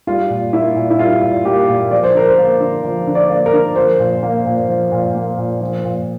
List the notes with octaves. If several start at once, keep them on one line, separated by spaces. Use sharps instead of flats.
G3 F4
A#2
A#3 E4
A#2
E4
G3 F4
A#2
A#3 G4
A#2
F3 D5
C5
D3 A#4
C5
A#3
D3
F3
D3
D5
A#3
A#4
D3
F3 C5
A#2
A#3
A#2
F3
A#2
A#3
A#2
F3
A#2